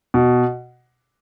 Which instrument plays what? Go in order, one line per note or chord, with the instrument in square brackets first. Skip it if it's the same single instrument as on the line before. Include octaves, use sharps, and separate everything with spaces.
[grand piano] B2